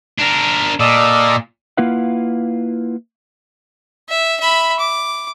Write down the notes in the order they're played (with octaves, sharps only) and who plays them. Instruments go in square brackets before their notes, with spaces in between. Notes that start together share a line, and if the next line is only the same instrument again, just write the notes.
[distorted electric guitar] D4 A#4
[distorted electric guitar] A#2 [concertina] A4 D5 D#5
[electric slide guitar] A#3 E4 F4 B4 F5 F#5
[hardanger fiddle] E5
E5 B5
D6